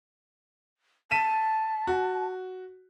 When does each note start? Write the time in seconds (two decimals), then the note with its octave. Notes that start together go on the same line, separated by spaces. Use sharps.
1.11 A5 B6 D#7 E7
1.87 F#4